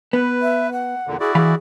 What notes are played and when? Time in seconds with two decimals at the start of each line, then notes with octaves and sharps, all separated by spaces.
0.13 B3 B4
0.42 E5
0.72 F#5
1.07 E2 A#2 D3
1.20 E4 F#4 G#4 D5
1.35 E3 G#4 F5 B5